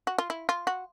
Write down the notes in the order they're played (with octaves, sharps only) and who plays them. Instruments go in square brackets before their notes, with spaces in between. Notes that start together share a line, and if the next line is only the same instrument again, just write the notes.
[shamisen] F#4
F4
E4
F4
F#4